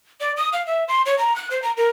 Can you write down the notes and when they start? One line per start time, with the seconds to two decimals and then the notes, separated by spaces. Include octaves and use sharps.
0.20 D5
0.37 D#6
0.53 F5
0.67 E5
0.88 C6
1.06 C#5
1.18 A#5
1.36 F#6
1.51 C5
1.62 A#5
1.77 A#4